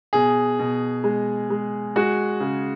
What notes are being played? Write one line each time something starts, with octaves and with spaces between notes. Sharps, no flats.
B2 G#4
B2
G#3
G#3
G#3 F#4
C#3